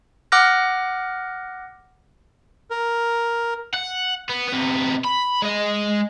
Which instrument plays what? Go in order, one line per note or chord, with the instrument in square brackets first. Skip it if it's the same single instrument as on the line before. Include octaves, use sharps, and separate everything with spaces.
[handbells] F#5 D6 F6 F#6 A#6
[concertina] A#4
[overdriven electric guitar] F#5
B3
C3 B3
B5
G#3 D#5